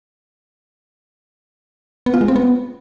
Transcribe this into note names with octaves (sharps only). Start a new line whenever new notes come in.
B3
F4
G#3
C4
B3